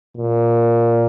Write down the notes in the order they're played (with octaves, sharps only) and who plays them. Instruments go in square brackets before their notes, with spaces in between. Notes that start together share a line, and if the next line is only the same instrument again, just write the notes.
[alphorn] A#2